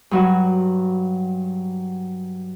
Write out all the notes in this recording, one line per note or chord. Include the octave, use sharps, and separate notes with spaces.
G2 F#3 F#4